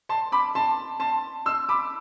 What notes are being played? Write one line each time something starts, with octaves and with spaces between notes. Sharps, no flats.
A5 C6
B5 D6
A5 C6
A5 C6
C6 E6
B5 D6